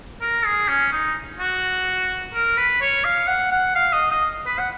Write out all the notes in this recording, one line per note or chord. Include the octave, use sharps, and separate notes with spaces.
A#4
G#4
C#4
D#4
F#4
A#4
B4
C#5
F5
F#5
F#5
F5
D#5
D#5
B4
F#5